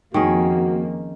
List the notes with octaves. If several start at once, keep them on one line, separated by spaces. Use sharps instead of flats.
F2 D#3 A#3 C#4 F#4 G#4